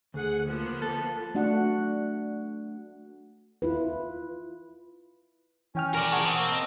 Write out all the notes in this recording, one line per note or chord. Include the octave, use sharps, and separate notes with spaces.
D2 G#4 F#5
F3 A#3 B3
A4
A3 D4 F#4 F#5
E4 F4 B4
E3 C#4 G5 F6
A#4 D5
G#4 F#5 A5 C#6
C4 D#6
A#3 A#4
D#5